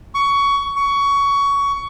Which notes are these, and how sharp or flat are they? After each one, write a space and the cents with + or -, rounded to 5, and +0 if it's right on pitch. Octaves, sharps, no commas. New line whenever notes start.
C#6 +20
C#6 +20